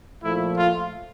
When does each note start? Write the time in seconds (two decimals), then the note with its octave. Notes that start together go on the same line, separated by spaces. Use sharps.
0.23 A#2 F3 A3 E4
0.57 F4